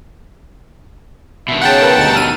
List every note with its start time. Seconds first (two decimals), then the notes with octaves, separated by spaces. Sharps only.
1.48 G2 B2 D#3 E5
1.62 C#3 F#5 G5 A5
1.82 A#4 B4
1.98 D2 G2 D#4 A6
2.15 E6 F6 D#7